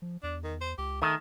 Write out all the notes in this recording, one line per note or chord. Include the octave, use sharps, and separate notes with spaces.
F3
E2 D4
D#3
C5
C#2 G4
D#3 A3